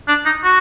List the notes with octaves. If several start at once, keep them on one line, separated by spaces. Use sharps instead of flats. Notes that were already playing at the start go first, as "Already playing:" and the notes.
D4
D#4
F#4